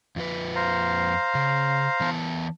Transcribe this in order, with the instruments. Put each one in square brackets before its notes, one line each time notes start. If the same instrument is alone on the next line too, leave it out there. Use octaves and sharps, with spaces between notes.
[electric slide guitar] F2 F3 B4
[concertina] C5 F5 A#5
[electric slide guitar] C#3
E3 B3 A5